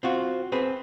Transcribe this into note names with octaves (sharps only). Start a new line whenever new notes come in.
C4 F4 F#4
C4 G#4 B4